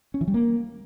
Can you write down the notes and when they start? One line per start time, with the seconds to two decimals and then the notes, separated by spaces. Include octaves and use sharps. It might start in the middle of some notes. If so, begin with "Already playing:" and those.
0.14 C#4
0.21 E3
0.28 G3
0.34 A#3